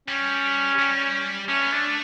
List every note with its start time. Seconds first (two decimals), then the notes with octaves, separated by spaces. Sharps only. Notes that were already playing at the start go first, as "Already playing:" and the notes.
0.08 G3 C#4
0.79 G3
1.48 A3 C#4
1.61 B3
1.72 A3 D4